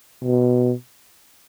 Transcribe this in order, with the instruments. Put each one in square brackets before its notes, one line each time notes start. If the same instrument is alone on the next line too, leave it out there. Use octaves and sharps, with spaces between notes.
[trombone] B2